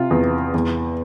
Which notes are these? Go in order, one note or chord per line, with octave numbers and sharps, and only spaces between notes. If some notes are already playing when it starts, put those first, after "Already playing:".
Already playing: C3 F4
E2
E2